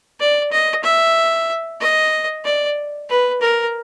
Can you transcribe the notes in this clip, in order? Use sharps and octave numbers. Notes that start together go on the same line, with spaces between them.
D5
D#5
E5
D#5
D5
B4
A#4